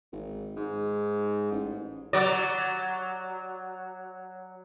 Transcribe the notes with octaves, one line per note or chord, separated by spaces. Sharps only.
G#1
G#2
A1
F#3 D5